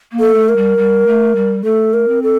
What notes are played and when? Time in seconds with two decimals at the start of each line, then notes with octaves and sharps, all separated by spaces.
0.12 A#3
0.20 A4
0.34 A3
0.49 A#4
0.56 G3
0.78 G3
1.07 A3
1.35 G3
1.64 A3 A4
1.93 A#4
2.08 C4
2.23 A4